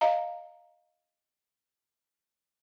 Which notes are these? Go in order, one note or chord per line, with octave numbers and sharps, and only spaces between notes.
D#5 F5 A#5